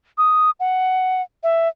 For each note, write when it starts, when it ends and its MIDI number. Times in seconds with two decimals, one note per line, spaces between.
0.18 0.50 87
0.60 1.22 78
1.43 1.68 76